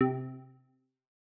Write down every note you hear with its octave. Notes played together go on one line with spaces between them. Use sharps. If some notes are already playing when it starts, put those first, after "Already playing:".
C3